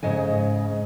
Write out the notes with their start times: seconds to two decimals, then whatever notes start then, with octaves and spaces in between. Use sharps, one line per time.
0.03 G#2 C#3 D#5 G#5